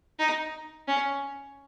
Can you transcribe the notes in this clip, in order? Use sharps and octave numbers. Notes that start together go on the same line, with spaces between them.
D#4
C#4